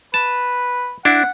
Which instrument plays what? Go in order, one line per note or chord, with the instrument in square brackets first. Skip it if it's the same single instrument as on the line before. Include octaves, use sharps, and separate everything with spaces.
[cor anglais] B4 [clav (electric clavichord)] A5
[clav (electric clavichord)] D4 E4 [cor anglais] F#5